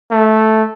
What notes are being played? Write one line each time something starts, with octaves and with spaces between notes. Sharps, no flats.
A3